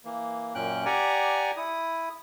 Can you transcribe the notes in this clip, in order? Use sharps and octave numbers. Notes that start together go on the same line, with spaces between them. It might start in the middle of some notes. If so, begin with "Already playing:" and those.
E3 A#3
F#2 A#2 C#4 G5 F#6
G4 D5 F#5 G#5 A#5
E4 D#6